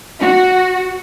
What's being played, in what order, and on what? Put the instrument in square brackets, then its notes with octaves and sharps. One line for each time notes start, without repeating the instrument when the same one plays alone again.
[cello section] F#4